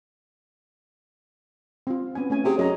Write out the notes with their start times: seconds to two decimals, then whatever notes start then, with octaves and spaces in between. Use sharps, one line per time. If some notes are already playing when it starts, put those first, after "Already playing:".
1.87 C4 F4
2.15 B3 C#4 G#5
2.30 A3 C#4 G#5
2.44 C3 F#4 G#4
2.58 F#2 C#5 D#5 A#5